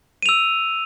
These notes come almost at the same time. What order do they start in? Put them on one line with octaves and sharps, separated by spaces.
D#7 F7 E6